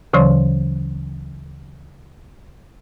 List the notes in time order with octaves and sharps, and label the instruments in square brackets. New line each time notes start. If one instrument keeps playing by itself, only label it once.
[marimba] D2 C#3 E3 F#3 C#5 C6